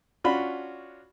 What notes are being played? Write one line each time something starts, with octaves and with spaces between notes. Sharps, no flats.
C#4 D4 F4 F#4 B5